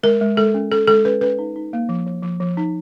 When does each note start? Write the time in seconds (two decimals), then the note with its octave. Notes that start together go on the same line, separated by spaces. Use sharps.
0.03 G#3 A#4
0.21 G#3
0.37 G#3 A4
0.54 C#4
0.72 C#4 A4
0.87 G#3 A4
1.05 C#4 B4
1.21 C#4 B4
1.39 D#4
1.56 D#4
1.73 A#3
1.89 F3
2.06 F3
2.23 F3
2.40 F3
2.57 D#4